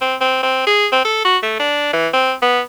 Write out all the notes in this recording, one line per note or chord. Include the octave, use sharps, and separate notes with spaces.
C4
C4
C4
G#4
C4
A4
F#4
A3
D4
E3
C4
B3